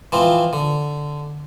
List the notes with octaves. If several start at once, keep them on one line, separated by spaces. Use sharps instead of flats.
E3 F3 C4
D3